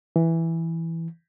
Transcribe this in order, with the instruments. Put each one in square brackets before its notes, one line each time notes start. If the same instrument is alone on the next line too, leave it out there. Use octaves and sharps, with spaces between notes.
[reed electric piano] E3